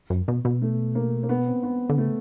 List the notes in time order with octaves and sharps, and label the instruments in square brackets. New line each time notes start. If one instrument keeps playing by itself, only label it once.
[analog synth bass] F#2
B2
B2
[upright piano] A3
A#3
A#3
B3
C4
B3
[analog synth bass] D3
[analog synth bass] C#3 [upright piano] A3